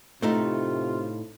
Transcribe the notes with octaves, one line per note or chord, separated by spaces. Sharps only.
A2 C3 A3 D#4 F4